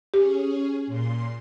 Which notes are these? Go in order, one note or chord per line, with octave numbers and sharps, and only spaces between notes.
C#4 G4 G#4
A#2 C6